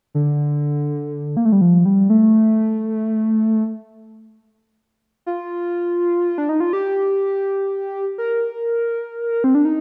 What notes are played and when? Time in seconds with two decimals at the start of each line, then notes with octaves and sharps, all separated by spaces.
0.15 D3
1.37 A#3
1.45 A3
1.52 G3
1.61 F3
1.85 G3
2.10 A3
5.26 F4
6.38 D4
6.49 D#4
6.60 F4
6.73 G4
8.18 A#4
9.44 C4
9.55 D4
9.65 D#4